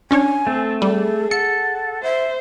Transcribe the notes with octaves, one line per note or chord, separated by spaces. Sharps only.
C#4 D4 C#5 G#5
A3 C4 A4
G3 G#4 A4
A4 F#5 C#7
C5 E5